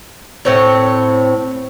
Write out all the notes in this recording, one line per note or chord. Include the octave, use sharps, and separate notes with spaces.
A2 C4 C#5